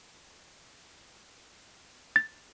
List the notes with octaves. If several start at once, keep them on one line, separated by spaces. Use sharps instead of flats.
A6